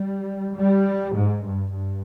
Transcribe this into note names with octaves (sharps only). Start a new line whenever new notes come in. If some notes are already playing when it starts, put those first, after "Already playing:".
Already playing: G3
G3
G#2
G2
G2